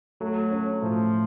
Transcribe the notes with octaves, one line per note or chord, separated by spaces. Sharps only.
F#3 A3
C#4
A2 F3